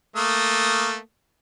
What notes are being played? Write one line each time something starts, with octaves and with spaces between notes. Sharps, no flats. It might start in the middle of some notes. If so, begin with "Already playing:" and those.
A3 A#3 D#6